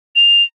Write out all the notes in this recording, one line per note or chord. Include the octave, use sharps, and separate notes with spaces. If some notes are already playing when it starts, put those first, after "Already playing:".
F7